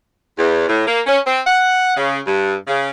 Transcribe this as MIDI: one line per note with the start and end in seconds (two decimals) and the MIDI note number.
0.38 0.65 40
0.68 0.84 45
0.87 1.01 58
1.07 1.19 61
1.26 1.41 60
1.46 1.95 78
1.96 2.19 49
2.26 2.54 43
2.67 2.90 49